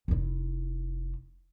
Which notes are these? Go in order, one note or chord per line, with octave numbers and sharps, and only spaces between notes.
F1 E4